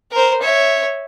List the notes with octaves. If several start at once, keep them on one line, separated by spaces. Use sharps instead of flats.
A#4 C5
C#5 E5